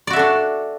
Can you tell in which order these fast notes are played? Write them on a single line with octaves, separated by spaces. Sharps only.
D5 F#4 E5 A4 D4